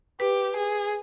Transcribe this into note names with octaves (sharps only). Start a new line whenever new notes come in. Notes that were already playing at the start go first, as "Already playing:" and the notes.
G4 B4
G#4